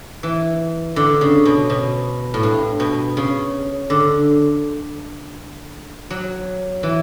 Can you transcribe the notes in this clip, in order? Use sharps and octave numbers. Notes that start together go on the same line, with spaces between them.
E3
D3
C#3
B2
B2
A2
G2
B2
C#3
D3
F#3
E3